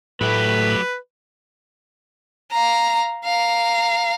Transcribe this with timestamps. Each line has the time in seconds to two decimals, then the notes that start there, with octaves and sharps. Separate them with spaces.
0.21 A2 F#3 A3 G4 B4 B5
2.52 F5 A#5
3.24 F5 A#5